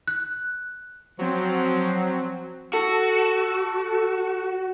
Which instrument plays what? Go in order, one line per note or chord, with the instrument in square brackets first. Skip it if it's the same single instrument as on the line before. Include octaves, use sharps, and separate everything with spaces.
[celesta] F#6
[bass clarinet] F3 [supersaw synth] F#3 C4
[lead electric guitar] F#4 [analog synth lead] A4